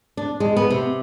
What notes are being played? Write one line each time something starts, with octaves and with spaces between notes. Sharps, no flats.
D4
G#3
B3
C3